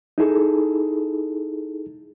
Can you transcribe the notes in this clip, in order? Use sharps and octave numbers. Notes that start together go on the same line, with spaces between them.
D#4 E4 G#4 A4